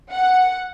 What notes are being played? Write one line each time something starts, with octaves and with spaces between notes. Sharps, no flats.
F#5